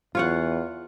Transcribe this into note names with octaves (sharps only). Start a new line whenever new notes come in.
E2 F4 C#5 F#5